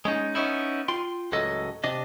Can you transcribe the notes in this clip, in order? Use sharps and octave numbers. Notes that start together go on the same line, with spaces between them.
G#3 C#4 D#4
B3 C#4 D#4 E4
F4 G5 C6
C#2 A2 F#3 A4 D#5
C3 D4 D#5